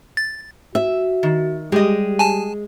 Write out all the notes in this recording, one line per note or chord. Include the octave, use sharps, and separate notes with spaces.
A6
F#4 E5
D#3
G3 G#3 G4 D#5
G#5 A5